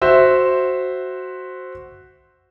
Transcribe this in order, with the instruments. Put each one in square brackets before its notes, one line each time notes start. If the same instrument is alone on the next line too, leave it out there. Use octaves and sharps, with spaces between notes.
[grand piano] F#4 C5 E5